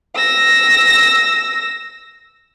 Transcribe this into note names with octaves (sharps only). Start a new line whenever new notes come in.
E6 A#6